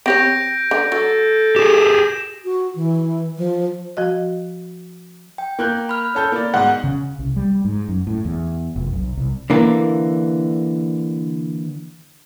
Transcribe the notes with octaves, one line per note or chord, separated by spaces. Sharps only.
C4 G4 C#5 G6 A#6 D7
D3
F#3 A4
G4 G#4 E7
F#4
E3
F3
F3 F#4 D#5
G5
A#3 F#6 G6
B5 F6
C#4 A4 G6
A#3 D5
G#2 B2 F#5
C#3
C2
G3
G#2
F#2
A2
E2
F1
B1
C2
D3 E3 A#3